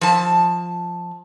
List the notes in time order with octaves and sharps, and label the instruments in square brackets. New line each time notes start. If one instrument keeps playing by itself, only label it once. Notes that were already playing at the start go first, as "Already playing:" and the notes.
[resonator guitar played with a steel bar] F3 A5